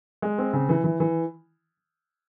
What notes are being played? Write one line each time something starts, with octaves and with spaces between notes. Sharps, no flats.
G#3
C4
C#3
E3
E3
E3